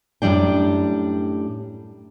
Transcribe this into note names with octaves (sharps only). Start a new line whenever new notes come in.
F#2 A2 D3 G3 D4 G5